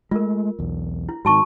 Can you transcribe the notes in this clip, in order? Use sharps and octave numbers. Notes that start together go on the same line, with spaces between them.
G#3 A3 F4 A#4
B1 E2
E4
G#2 D#3 F#4 A5 C#6